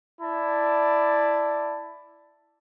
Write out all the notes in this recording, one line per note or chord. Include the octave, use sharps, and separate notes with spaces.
E4 D5 A5